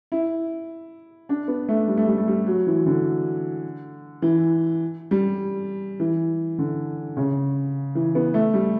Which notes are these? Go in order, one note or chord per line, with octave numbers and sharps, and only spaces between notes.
E4
D4
B3
A3
G3
A3
G3
A3
G3
F#3
E3
D3
E3
G3
E3
D3
C#3
E3
B3
A3
G3